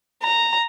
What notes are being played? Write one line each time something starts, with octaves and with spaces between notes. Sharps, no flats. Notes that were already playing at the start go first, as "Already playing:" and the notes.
A#5